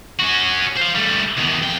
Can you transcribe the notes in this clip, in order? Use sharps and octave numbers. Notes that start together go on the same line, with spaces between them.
C#4 F#4
C5 F5
G3 A3
E2 D#3
F2 G5